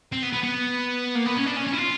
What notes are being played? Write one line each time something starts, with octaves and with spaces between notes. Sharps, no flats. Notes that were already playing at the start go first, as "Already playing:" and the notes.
C4
B3
B3
B3
A#3
B3
C#4
D4
C#4
C#4
E4
F4